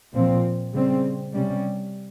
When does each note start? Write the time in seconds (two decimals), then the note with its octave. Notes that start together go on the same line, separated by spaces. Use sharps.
0.14 A#2 F3 C4
0.74 C#3 G3 C4
1.34 C3 G3 C#4